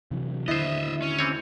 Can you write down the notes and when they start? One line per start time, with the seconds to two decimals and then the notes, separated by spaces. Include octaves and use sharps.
0.11 C3 E3 F#3
0.48 D#2 D3 B3 E4 C5 D#5 E5
1.02 C#4
1.19 E3 C4 C#5